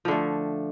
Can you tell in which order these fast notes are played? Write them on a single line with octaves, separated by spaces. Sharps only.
F3 D3 A3